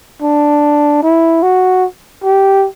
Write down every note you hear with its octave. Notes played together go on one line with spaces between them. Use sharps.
D4
E4
F#4
G4